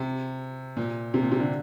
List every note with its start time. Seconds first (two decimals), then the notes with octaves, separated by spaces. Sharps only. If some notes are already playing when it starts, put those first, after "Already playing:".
Already playing: C3
0.77 A#2
1.14 C3
1.22 A#2
1.32 C3
1.40 D3